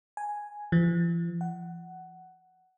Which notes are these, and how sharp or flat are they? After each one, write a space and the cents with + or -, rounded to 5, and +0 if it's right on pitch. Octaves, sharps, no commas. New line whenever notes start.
G#5 +0
F3 -45
F#5 +10